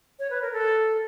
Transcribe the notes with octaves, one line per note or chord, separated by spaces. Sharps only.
C#5
B4
A#4
A4